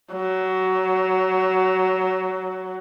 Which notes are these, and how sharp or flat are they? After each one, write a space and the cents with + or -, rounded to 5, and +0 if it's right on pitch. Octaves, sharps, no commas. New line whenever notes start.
F#3 +15